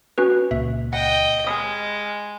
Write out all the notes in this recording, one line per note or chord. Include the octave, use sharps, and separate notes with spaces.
C#4 F#4 B4
C#2 A#2 E5
D#5 F#5 G5
G#3 B5 D#6 F6